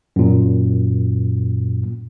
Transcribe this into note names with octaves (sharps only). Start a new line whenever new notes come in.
F#2 A#2